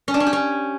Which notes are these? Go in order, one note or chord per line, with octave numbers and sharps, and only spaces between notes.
C#4
D4
C#4
G4
C#4